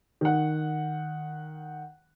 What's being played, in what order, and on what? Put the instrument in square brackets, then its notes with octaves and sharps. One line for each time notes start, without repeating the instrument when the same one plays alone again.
[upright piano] D#3 F#5